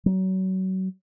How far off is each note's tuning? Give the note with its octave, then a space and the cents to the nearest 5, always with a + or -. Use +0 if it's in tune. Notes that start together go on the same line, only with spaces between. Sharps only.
F#3 +30